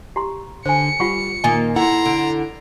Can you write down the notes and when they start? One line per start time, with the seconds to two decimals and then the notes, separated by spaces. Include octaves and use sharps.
0.16 G4 A#5 C6
0.66 D3 C5 G#5 C#7
1.00 G3 F4 F#5 C#6
1.44 A#2 D#3 A#3 F4 D#5 G#5
1.76 E4 A4 F#5 A#5 C6
2.05 D3